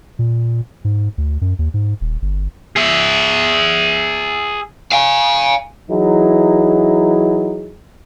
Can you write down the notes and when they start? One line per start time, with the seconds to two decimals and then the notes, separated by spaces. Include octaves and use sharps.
0.19 A#2
0.85 G#2
1.18 D2
1.41 F#2
1.59 D#2
1.74 G#2
2.01 D#1
2.22 G1
2.76 G#4 E5
4.92 F5 G#5
5.90 E3 F#3 D#4 E4 G#4